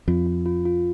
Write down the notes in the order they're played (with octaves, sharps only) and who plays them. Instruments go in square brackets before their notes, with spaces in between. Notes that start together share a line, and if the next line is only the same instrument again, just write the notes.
[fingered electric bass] F2 [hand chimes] F4
[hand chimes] F4
F4
F4